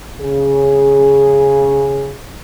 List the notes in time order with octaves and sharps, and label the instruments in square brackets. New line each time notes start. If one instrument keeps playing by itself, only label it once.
[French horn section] C#3 G#4